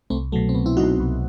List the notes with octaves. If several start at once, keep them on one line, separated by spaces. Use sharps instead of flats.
C2 A3 C4
B2 F#3 A3
C4
C2 B3
C4 E4
B2 F#3 D#4 F#4
C2